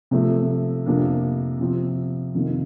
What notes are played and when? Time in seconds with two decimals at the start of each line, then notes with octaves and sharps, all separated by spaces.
0.11 C3 F3 A3 C4
0.86 F2 C3 F3 A#3 D4
1.60 C3 F3 C4
2.34 F2 C3 D#3 A#3 D#4